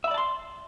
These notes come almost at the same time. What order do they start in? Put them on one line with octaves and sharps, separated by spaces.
E5 B5 D5 A5 C6